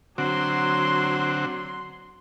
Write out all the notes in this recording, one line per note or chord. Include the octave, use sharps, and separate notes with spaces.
D3 F#3 C4 F#4 C6